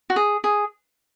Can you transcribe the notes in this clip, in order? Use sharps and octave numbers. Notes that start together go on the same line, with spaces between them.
F#4
G#4
G#4